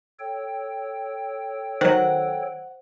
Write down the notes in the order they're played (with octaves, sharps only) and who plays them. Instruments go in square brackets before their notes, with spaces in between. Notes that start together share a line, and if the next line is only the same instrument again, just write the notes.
[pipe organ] A4 C#5 G5
[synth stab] D#3 F#3 [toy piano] C5 [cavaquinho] F#5